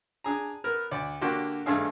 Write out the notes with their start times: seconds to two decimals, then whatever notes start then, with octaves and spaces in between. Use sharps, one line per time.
0.24 D4 G#4 A#5
0.64 B3 A#4
0.91 D2 D5
1.21 D3 A#3 D4 F#4 G4 C6
1.66 G#1 G2 A3 D4 G#4 F5